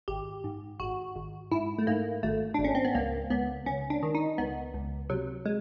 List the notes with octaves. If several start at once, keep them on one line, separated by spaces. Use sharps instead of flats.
G#1 G4
G#2
G#1 F#4
G#1
G#2 E4
A3
G#2 A#3
G#1 A3
G#1 D4
C#4
C4
B3
C#2 A#3
C#2 B3
C#2 C#4
D4
D#3
D#4
C#2 B3
C#2
C3 F#3
G#3